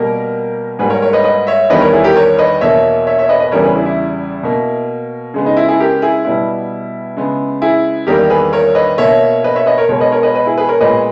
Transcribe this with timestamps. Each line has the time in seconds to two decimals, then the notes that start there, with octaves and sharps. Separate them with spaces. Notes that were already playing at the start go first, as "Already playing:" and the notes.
Already playing: B2 G3 A#3 G4 A#4
0.79 G#2 G3 A#3 G#4 B4
0.90 A#4 C#5
1.02 A#4 C#5
1.13 B4 D#5
1.24 B4 D#5
1.47 C#5 E5
1.70 E2 D#3 G3 B3 B4 D#5
1.81 A#4 C#5
1.93 E4 G#4
2.04 G4 A#4
2.16 A#4 C#5
2.39 B4 D#5
2.61 E2 B2 A#3 C#5 E5
3.07 C#5 E5
3.19 C#5 E5
3.29 B4 D#5
3.40 B4 D#5
3.52 E2 C#3 E3 G3 A#4 C#5
3.63 G#4 B4
3.75 E4 G#4
3.86 E4
4.43 B2 A#3
5.34 C#3 G#3 B3
5.46 D#4
5.57 E4
5.68 E4 G#4
5.80 G4 A#4
6.02 E4 G#4
6.25 B2 G3 B3 E4
7.17 C#3 G#3 B3
7.62 E4 G#4
8.07 E2 D#3 G3 A#3 G4 A#4
8.30 G#4 B4
8.53 A#4 C#5
8.75 B4 D#5
8.98 B2 A#3 C#5 E5
9.44 B4 D#5
9.56 C#5 E5
9.66 B4 D#5
9.78 A#4 C#5
9.89 B2 G#3 B3 A#4 C#5
10.00 B4 D#5
10.12 A#4 C#5
10.23 B4 D#5
10.35 B4 D#5
10.46 E4 G#4
10.58 G#4 B4
10.68 A#4 C#5
10.81 A#2 G#3 B3 B4 D#5